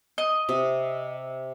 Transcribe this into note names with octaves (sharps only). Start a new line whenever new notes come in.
D#5
C3